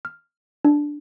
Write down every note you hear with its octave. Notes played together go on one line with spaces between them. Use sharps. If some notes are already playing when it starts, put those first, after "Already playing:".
F6
D4